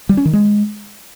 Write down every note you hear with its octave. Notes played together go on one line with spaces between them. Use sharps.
G3
C#4
D#3
G#3